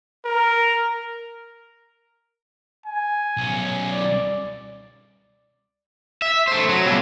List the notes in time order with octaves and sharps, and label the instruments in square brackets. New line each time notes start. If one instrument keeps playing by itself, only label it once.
[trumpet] A#4
G#5
[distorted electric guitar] B1 C#4
[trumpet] D5
[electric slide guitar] E5
A3 C5
F#3
B2 G3 F4 G4 A4